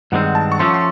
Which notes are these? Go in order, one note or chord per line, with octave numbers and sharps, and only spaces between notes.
G2 D#3 G#3 C4 F#5
A5
C#6
F3 A3 C#4 C6
C6